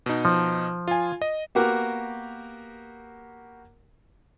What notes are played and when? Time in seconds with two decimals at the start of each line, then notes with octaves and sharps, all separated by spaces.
0.06 B2 D#4
0.25 F3
0.88 F4 G#5
1.22 D#5
1.55 A#3 B3 F#4 G4 A#4